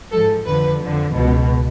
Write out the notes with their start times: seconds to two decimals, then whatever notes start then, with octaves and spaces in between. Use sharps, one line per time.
0.11 G#2 F3 A4
0.45 F2 D3 F3 B4
0.79 F2 D3 F3
1.13 C#2 B2